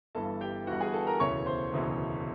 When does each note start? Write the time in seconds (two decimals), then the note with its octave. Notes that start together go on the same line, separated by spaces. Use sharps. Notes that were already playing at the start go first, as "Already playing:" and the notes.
0.15 G1 G2 E3 A4 A5
0.41 G4 G5
0.67 G1 G2 E3 F#4 F#5
0.80 G#4 G#5
0.93 A4 A5
1.07 A#4 A#5
1.20 E1 D2 C#3 E3 C#5 C#6
1.46 C5 C6
1.72 E1 D2 C#3 E3